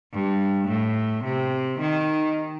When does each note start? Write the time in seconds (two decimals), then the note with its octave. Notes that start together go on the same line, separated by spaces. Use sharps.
0.13 G2
0.68 A2
1.24 C3
1.79 D#3